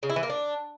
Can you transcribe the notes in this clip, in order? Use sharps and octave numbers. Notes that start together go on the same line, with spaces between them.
C#3
E4
E3
A#3
D4